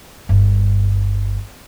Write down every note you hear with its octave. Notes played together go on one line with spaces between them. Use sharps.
G1 G2